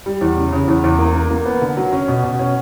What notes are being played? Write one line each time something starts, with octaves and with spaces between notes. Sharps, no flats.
G3
E2
C#3
C#3
E2
E2
A#3
A#3
A#3
B3
D3
F#3
C#4
B2
B2
C#4